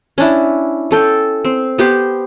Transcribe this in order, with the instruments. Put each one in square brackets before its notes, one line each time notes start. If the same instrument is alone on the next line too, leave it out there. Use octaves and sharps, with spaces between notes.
[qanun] C#4 D4 E4
C#4 A4 G5
C4
B3 G4 C5